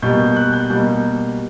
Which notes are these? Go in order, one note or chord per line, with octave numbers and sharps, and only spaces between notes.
B2 G3 A#3 G6
G6
F#6
G6
B2 G3 A#3